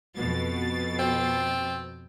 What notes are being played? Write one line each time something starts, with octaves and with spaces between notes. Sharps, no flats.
F2 B2 A6
C4